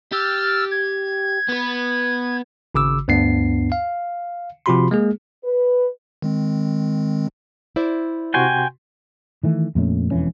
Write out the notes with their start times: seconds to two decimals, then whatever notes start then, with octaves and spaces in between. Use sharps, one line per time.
0.12 G4 E6 F6 A6
0.71 G#6
1.49 B3 B4
2.75 G#1 C#3 D6 E6
3.08 D2 G2 B3 D4 C7
3.72 F5
4.66 C3 F3 F4 F#4 B5 C6
4.91 G#3 A#3 G#4
5.44 B4
6.22 D#3 G#3 C4
7.76 E4 C5 D5
8.34 C3 F#4 G5 G#5 C6
9.43 D#3 E3 A3
9.75 F2 A#2 A3 C#4
10.11 E1 F2 E3 C#4